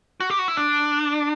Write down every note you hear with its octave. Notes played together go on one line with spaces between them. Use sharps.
F#4
G4
F#4
E4
D4